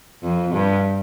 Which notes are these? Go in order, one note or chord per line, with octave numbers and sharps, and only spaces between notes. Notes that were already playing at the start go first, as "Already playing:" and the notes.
F2
G2